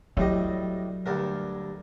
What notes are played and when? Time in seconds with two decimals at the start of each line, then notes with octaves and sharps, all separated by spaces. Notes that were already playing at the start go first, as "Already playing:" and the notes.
0.17 A2 F#3 G3 D#5
1.06 D2 G2 A#4